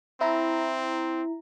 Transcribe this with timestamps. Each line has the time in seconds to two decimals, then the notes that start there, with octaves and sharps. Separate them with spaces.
0.21 C4 E4 A#5